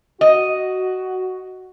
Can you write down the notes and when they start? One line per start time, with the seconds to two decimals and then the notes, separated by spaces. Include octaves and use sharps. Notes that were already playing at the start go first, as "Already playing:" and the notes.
0.21 F#4 D#5